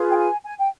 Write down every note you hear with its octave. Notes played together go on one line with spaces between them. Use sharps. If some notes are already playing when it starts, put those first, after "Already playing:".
Already playing: F4 G#4 B4
G5
G#5
G#5
G5